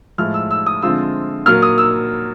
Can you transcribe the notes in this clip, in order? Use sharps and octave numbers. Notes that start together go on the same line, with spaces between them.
A2 F3 G#3 F6
E6
E6
D#6
D3 F3 G#3 C4 F4 E6
A#2 F#3 A#3 F6
D#6
E6